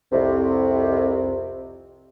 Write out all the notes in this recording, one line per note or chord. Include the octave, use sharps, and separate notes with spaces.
C2 F2 C3